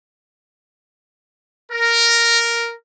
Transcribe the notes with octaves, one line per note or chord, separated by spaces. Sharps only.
A#4